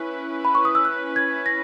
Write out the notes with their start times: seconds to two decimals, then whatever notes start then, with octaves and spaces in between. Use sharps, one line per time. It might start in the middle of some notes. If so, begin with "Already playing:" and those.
Already playing: C#4 E4 B4
0.45 B5
0.55 C#6
0.65 D#6
0.75 E6
0.85 F#6
1.16 G#6
1.46 A#6